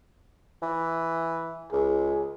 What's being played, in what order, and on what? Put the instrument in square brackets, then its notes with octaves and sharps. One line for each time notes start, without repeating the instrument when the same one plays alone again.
[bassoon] E3
[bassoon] C#2 [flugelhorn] G#4